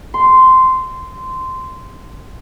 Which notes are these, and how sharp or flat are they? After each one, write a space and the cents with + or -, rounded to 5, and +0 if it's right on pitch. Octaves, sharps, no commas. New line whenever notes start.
C6 -10